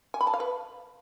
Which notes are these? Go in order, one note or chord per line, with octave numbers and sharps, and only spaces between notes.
G#5
B5
A5
F5
B4